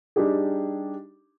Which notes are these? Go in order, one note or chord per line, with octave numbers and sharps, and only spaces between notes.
G3 D4 D#4 G4 G#4